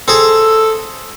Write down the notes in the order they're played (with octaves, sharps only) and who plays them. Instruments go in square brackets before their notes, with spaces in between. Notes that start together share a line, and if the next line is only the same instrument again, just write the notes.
[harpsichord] C4 G#4 [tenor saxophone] A4